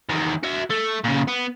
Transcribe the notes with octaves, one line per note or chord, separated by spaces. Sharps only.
E2 D#3
F#4 E5
A3
A#2 C#3
B3